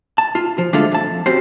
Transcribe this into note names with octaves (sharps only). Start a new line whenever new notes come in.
A5
F4
F3
D3 G#3 A3 D4 F4 A4
F2 A5
C4 C#4 F#4 G4 C5